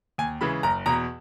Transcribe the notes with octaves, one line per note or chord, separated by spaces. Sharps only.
D#2 G#5
C#3 E3 G#3 B5
F#1 A#5
E2 B2 A#5